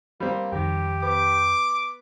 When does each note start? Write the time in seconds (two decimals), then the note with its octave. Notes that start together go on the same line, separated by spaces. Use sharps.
0.20 G3 A#3 C4
0.52 F2 D#3 G4
1.03 B3 D6